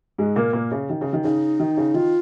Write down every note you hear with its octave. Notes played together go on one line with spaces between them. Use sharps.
G#2 G#3
A#2 A#3
A#2 A#3
C#3
D#3
C#3
D#3
C#3 D#4
D#3
C#3
D#3 F4